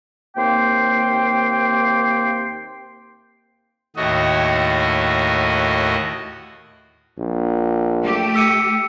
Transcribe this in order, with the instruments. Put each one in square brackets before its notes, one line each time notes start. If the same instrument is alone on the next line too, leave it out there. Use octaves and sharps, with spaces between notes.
[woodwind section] D#2 C3 A#3 G5 C6
[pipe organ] D#2 A2 F#4 D#5
[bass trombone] A#1
[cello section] A3 G4
[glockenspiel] E6 C#7 D#7